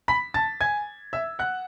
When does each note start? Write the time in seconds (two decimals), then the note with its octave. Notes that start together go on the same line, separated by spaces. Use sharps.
0.08 B5 B6
0.34 A5 A6
0.61 G#5 G#6
1.13 E5 E6
1.39 F#5 F#6